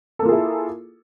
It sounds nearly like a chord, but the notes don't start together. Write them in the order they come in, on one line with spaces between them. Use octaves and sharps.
A4 A#3 F4 G#4 E4